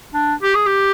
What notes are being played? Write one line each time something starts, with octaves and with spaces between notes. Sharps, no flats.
D4
G4
G#4
G4